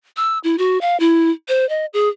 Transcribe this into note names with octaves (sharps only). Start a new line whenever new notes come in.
E6
E4
F#4
F5
E4
C5
D#5
G#4